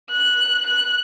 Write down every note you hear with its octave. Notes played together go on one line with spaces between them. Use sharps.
F#6
F#6